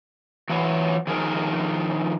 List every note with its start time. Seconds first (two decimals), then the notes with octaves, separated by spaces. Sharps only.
0.49 E3 F#3 C#5
1.07 D#3 F3 G#4 A#4